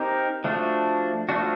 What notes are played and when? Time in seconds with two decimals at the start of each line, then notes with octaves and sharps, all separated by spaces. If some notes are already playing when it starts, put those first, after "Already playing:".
Already playing: C4 D#4 G4 A#4
0.44 F3 A3 D4 F#4
1.29 F3 A3 D4 F#4